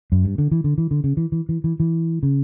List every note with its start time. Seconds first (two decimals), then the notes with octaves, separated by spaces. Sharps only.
0.12 F#2
0.25 G2
0.38 D3
0.51 E3
0.64 D3
0.78 E3
0.91 D3
1.04 C#3
1.17 E3
1.32 E3
1.49 E3
1.64 E3
1.80 E3
2.23 C#3